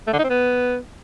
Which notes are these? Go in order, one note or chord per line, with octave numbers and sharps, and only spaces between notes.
A3
D3
D#4
C4
B3